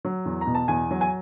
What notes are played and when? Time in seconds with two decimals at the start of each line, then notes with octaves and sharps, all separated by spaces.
0.05 F#3
0.25 E2
0.41 A#5
0.47 B2
0.55 A5
0.68 E2 G#5
0.91 F#3
1.01 G#5